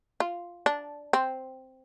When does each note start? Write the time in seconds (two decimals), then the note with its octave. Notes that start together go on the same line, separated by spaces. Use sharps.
0.20 F4
0.66 D4
1.13 C4